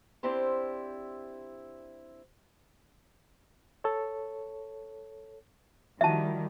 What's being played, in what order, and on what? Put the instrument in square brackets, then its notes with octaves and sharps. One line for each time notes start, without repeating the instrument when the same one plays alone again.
[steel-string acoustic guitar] C4 D4 E4 G4 C5
[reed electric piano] A4 C#5
[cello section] D#3 G3 [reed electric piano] F3 E4 F#4 [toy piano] E5 A5